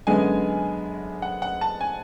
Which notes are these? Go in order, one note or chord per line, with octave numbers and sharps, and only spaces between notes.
F#2 D3 G#3 B3 G#5
F#5
F#5
A5
G#5